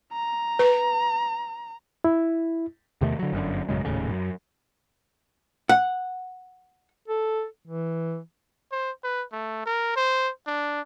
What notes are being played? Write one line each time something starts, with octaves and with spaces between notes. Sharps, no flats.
A#5
B4
E4
E2 C3 D#3 A3
D3 F#3
G1 F#2 D3
A1 F#2 C#3 G#3
D#1 D#2 A2 C#3
F#2
F#5
A4
E3
C5
B4
A3
A#4
C5
D4